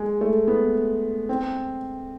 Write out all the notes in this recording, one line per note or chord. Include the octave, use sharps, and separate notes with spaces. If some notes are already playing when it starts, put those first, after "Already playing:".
Already playing: G#3
A3
B3
C4